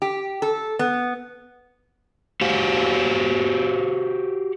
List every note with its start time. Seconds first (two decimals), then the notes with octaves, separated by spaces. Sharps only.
0.02 G4
0.42 A4
0.79 B3
2.41 F#4 G4 C5 F5